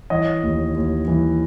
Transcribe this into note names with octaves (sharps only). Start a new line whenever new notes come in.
E3 C#5 D#5
D#2
D#2
E3